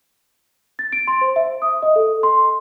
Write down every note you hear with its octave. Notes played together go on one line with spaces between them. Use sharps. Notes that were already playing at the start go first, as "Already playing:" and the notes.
A6
D7
C6
C5
E5
D#6
D#5
A4
C6